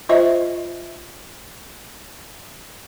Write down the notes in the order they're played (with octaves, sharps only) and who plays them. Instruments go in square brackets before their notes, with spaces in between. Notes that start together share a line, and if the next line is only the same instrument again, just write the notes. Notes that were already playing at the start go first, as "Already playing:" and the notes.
[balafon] F4 C5 D#5 E5